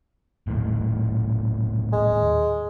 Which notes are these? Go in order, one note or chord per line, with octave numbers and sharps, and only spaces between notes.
D#1 D#2 A2
G#3